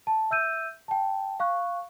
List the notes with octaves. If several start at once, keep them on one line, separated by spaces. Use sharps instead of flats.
A5
E5 E6 G6 D#7
G5 A5
F5 C#6 F#6